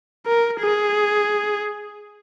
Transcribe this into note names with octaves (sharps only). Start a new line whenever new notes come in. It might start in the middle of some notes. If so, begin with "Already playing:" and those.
A#4
G#4